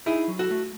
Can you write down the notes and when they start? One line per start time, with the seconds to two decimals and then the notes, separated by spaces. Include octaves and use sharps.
0.06 D#4 E4 G#4
0.28 F#3
0.39 F#4 A4
0.51 A3